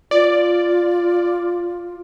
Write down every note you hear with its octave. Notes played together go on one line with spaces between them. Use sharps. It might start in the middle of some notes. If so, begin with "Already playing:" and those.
F4 D5